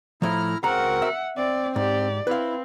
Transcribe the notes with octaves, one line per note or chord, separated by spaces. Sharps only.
A2 F3 E4 A#5 F6
C#2 C4 F#4 A#4 F#5 A#5
E5
C4 D5
G#2 G4 D5
C4 E4 B4 F5